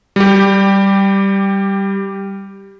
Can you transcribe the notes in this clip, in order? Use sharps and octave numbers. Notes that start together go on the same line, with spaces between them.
G3 G4